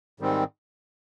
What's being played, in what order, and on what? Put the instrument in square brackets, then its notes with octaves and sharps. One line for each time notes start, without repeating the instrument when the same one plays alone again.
[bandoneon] G#2 D#3 G3 C4